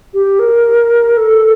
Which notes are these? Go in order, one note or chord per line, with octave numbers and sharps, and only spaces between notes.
G4
A#4
A4